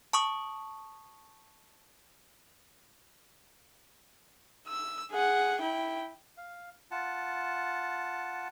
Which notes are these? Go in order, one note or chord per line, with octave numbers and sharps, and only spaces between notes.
A5 C#6 D#6
E6
G#4 F#5
E4 G5
F5
F4 F#5 A5